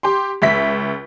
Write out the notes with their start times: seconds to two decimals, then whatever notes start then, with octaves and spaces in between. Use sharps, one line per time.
0.03 G4 C6
0.42 C#2 E5 B6